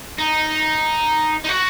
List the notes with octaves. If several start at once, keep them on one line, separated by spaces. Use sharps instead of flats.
D#4
D#4
F#4